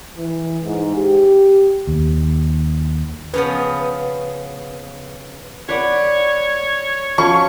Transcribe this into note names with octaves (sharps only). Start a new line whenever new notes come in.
E3
G#2
G4
D#2
C#3 F3 B3 B4
B4 C#5 D5 F#5
F3 F#3 C#4 C#6